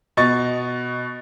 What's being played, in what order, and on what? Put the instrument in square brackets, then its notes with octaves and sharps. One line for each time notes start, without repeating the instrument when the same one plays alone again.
[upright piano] B2 D#5 C#6 A6